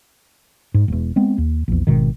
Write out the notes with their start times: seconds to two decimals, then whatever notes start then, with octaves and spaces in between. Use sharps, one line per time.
0.74 G#2
0.88 E1 E2
1.16 G#3 B3 C4
1.38 D#2
1.68 A#1 E2
1.87 G#1 B2 D#3